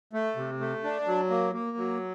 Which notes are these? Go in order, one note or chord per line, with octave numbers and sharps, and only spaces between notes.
A3
C3
A3
D4
F#3
A#3
A#3
F#3